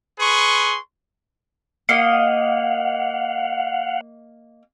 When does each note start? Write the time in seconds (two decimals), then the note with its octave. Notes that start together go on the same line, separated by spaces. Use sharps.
0.19 G#4 B4 C6 C#6
1.89 A#3 D#5 F5 F#5